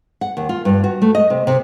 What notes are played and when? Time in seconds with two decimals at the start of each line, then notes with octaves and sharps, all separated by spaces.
0.21 F#5
0.37 D#2
0.49 F4
0.65 G2
0.84 F#4
1.02 A3
1.15 D#5
1.30 C3
1.47 C3